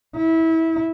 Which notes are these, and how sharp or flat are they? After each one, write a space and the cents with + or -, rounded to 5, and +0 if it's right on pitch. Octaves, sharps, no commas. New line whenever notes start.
E4 -20